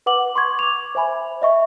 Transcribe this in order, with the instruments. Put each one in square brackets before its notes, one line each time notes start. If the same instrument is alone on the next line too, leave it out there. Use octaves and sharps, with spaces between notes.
[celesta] B4 F#5 D6 F#7
C6 C#6 G#6
D6 F7
C5 E5 G#5 B5
D#5 E5 C#6